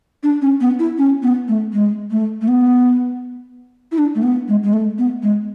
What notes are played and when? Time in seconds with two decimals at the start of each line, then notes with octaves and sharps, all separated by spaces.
0.23 D4
0.42 C#4
0.61 B3
0.79 E4
0.98 C#4
1.23 B3
1.48 A3
1.73 G#3
2.11 A3
2.41 A3
2.48 B3
3.92 E4
3.98 D4
4.15 A3
4.23 B3
4.48 G#3
4.63 G#3
4.73 A3
4.98 B3
5.23 G#3